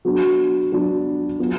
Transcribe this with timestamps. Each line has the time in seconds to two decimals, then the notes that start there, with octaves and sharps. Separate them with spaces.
0.05 F#3 B3 D4 F#4
0.72 F#3 B3 D4 F#4
1.39 F#3 B3 F4